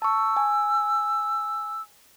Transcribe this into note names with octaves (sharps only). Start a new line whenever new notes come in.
A5 C#6 E6
G#5